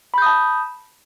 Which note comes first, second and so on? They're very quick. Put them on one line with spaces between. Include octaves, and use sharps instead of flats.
B5 G6 D#6 A5